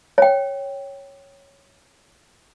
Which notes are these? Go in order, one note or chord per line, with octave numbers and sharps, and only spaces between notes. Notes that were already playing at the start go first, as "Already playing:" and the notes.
C#5 G5